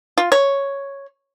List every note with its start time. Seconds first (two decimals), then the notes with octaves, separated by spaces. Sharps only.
0.18 F4
0.32 C#5